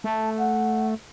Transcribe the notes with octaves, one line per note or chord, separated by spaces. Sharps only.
A3 A5
F#5